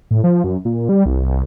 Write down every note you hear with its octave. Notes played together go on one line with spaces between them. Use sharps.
A2
F3
F#2
A#2
G3
C2